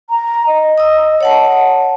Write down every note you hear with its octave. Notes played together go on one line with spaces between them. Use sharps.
A#5
D#5
D#6 E6
C#5 F#5 A5